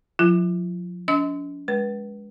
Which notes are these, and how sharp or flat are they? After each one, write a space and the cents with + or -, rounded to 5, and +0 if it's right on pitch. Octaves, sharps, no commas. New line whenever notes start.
F3 +40 F4 -45
D4 -45 D#5 +35 E6 -35
G#3 +0 B4 -25